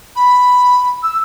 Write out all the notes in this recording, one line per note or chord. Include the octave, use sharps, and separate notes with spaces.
B5
E6